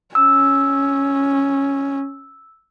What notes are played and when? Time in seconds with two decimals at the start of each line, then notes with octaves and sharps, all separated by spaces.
0.15 C#4 E6